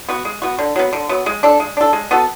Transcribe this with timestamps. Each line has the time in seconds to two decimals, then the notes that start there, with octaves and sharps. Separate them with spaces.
0.09 B3 F#4
0.25 G#3
0.42 B3 F#4
0.59 D3
0.76 F#3 B3
0.93 D3
1.09 F#3 B3
1.26 G#3
1.43 D4 A4
1.60 G#3
1.77 D4 A4
1.93 G#3
2.11 B3 F#4 A4